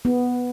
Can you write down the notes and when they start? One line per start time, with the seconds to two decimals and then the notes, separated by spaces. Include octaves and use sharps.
0.05 B3